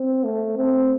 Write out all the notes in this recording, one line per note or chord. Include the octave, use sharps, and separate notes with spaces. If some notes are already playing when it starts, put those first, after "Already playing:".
Already playing: C4
A3
C4